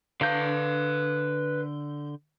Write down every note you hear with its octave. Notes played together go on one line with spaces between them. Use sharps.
D3 B4 F5 G6